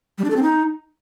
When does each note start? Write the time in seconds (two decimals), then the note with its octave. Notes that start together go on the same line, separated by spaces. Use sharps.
0.18 G3
0.24 D4
0.30 A4
0.36 C4
0.43 D#4